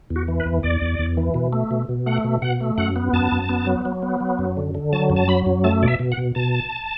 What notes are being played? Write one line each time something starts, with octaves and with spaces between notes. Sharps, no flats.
E2
F#4
E3
B4
E2
E2 D5
E2
E2
E3
B2
A3
B2
B2
A3 F#5
B2
B2 F#5
A3
F#2 F#5
B3
F#2 A5
F#2
B3
F#3
F#3
B3
F#3
F#2
D3
D3
F#3 A5
F#2
A5
F#3 B5
F#2
A3 A5
B2 D5
E5
B2
F#5
B2
B2 A5